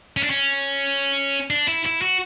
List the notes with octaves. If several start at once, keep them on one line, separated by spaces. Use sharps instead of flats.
C#4
D4
C#4
D4
E4
E4
F#4